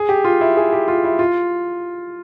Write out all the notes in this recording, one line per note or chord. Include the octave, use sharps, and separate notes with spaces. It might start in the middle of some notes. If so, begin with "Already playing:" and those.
Already playing: G#4
G4
F4
E4
G#4
G4
F4
E4
F4